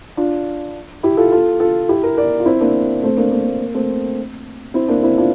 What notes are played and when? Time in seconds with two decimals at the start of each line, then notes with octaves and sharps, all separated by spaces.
0.17 D4 F4
1.03 E4 G4
1.17 F4 A4
1.32 F4 A4
1.60 F4 A4
1.89 E4 G4
2.03 G4 A#4
2.17 A#4 D5
2.40 F4
2.46 C4 E4
2.61 A#3 D4
3.03 A3 C4
3.17 A#3 D4
3.32 A#3
3.46 A3
3.60 A#3
3.74 A3 C4
4.74 C4 E4
4.88 A#3 D4
5.03 C4 E4
5.18 D4 F4